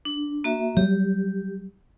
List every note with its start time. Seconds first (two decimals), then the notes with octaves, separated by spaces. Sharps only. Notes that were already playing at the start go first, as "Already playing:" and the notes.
0.05 D4
0.44 A#3 F#4 E5
0.77 F#3 G3 G4